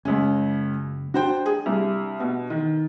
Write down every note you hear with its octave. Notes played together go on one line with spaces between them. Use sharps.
F#1 C#2 C#4
D4 F#4 C5 G5
G#4
C2
B2
D#3